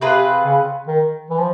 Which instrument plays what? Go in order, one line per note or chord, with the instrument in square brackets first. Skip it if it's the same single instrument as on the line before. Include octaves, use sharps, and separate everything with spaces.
[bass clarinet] C3 [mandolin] C4 F4 G#4 B4
[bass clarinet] C#3
D#3
E3
F3